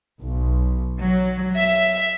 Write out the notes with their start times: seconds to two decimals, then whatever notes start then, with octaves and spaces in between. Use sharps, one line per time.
0.19 B1
1.00 F#3
1.56 E5